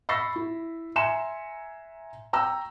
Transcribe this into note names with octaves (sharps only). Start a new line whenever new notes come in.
B5 C#6 E6 A6 A#6 C7
E4
E5 G#5 A#5 C6 C#7 E7
G5 A#5 C#6 E6